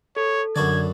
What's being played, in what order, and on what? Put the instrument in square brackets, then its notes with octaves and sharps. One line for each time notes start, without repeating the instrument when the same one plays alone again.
[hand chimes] A4 [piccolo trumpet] C#5
[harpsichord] F#2 F#4 D5 [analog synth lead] D3 [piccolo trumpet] G#6